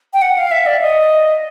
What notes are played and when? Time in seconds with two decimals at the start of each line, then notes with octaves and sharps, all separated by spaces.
0.13 G5
0.22 F#5
0.38 F5
0.51 E5
0.66 D5
0.81 D#5